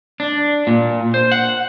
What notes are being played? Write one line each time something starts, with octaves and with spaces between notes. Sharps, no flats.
D4
A#2
C5
F#5